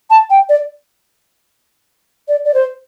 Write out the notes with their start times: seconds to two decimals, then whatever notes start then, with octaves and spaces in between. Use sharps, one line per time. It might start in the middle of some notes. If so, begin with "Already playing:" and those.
0.10 A5
0.29 G5
0.49 D5
2.28 D5
2.44 D5
2.54 C5